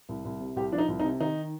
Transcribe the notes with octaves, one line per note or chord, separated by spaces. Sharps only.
C2
C2
C3
C2 G4
F3 D4
D#4
C2
D#4
C3
D#3 D#4